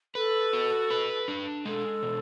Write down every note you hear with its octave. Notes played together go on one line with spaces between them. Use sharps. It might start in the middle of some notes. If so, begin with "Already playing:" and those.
A4 B4
F#4
B4
D4
G#3 A4
B2